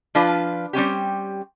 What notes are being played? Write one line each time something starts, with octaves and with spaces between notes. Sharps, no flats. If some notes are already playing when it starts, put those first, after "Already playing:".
F3 D4 F4 B4
G3 C4 C#4 G4